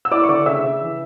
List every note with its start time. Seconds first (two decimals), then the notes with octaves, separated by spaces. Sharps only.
0.05 E6
0.11 E4 D5 D6
0.24 C#6
0.29 D3 D5 D6
0.46 C#3 E5 E6
0.64 C#3
0.81 E3